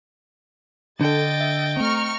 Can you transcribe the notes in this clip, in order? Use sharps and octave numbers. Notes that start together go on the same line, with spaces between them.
D3 D4 A4 D#5 G5 A6
E5
A3 C4 A#5 C#6 F6